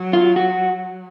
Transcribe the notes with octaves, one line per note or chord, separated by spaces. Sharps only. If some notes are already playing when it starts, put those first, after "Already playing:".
Already playing: F#3
F4
F#4